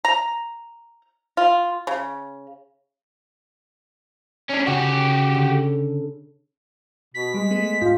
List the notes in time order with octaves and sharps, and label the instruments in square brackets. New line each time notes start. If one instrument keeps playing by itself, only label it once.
[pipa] A#5
F4
C#3
[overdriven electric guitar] C#4 D4
[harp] C#3 [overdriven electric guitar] F#4 G4
[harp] D3
[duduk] B2 [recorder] B6
[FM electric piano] G3 [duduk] G#3
[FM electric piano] A3 B3 G#4
[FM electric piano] G#2 F5 [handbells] F4